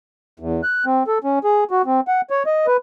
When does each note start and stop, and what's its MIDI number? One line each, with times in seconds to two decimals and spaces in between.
0.40 0.61 40
0.64 0.85 90
0.86 1.03 60
1.07 1.18 69
1.24 1.39 61
1.44 1.64 68
1.71 1.82 66
1.86 2.00 60
2.08 2.21 78
2.30 2.43 73
2.46 2.67 75
2.67 2.77 71